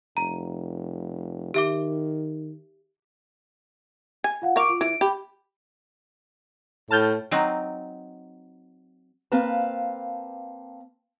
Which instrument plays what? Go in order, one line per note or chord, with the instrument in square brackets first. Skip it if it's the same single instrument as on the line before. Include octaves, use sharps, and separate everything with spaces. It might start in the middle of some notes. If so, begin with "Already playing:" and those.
[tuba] F1 [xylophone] A#5
[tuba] D#3 [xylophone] G4 E5 D6
[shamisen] G#5
[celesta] F4 F5 F#5
[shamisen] A#4 F5 [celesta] C#6 D6 D7
[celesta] F4
[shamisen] E3 [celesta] D7
[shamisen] G4 [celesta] B5
[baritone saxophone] A2 [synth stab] A5 F6 G6
[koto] F#3 C4 D#4
[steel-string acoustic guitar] A#3 C4 B4 F5 A5